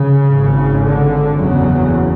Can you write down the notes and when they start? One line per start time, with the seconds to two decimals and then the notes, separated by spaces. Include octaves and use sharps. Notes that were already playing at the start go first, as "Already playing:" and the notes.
Already playing: C#3
0.30 G#1 G#2
0.83 D3
1.36 F#1 E2 C#3 F#3